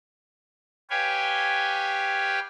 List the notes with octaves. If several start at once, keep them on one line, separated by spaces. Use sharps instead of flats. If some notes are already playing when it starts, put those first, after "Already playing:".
G4 B4 C#5 F5 G5 G#5